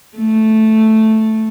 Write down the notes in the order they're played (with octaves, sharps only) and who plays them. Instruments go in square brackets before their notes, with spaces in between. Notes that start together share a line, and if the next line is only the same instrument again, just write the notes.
[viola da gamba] A3